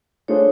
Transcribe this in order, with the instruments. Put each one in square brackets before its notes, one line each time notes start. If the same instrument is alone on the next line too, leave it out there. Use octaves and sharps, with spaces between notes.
[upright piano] A3 D4 F4 G#4 C5 [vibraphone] C#5